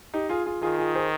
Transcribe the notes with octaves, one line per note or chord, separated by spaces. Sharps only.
D#4 G4
F4 G#4
F4 G#4
D#3 F4 G#4
F4 G#4
G#4 C5